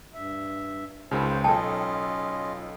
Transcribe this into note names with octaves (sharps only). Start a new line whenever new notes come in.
G2 E5
C#2 C#3 D#4 F4 A#4 C5
B1 C#4 F4 A4 D#5 G5 A5